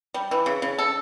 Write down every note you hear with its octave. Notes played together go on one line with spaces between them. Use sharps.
G3
E3
C#3
C#3
A4